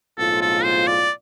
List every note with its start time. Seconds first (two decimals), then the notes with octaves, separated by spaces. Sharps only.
0.18 B1 A2 G#3 C4 F4 A4
0.41 A4
0.64 C5
0.87 D5